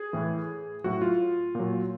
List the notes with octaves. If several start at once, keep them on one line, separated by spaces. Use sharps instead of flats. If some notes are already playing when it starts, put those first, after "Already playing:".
Already playing: G#4
A2 E3
A2 F#3 F#4
F4
A#2 F#3